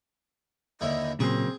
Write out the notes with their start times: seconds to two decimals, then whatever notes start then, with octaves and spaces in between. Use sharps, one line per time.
0.81 D#2 D3 E4 D#5
1.20 A#2 C#3 F#3 A#3 C4 G#4